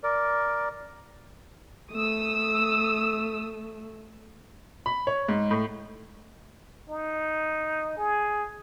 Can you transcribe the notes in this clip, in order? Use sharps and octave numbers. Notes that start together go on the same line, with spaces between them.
A#4 D5
A3 D#6 E6
B5
C#5
G#2
A2
D#4
G#4